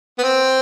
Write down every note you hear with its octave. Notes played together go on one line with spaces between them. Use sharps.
B3
C4